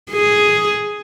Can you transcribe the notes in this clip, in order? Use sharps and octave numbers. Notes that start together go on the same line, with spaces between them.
G#4